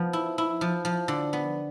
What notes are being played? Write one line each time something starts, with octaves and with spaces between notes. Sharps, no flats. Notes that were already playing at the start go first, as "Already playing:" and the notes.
Already playing: F3 B3
E4
E4
F3
F3
D3
B3